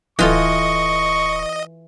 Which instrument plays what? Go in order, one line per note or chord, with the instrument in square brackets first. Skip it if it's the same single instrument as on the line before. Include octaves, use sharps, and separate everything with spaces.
[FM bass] D1 [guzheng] E3 F4 A4 [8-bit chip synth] D#5 [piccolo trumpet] C#6